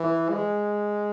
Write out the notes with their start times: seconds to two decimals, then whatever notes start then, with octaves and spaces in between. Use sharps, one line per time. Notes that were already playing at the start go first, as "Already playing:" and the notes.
Already playing: E3
0.30 G#3